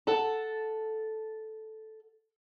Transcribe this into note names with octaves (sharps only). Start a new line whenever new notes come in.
A4 F#5 A5